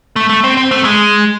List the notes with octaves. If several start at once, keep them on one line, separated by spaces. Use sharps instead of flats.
A3
A3
C4
C4
A3
G#3